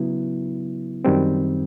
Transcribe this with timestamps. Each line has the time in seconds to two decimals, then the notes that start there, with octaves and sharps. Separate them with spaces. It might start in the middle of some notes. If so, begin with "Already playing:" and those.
Already playing: C#3 F#3 B3 E4
1.04 F#2 D#3 G3 C4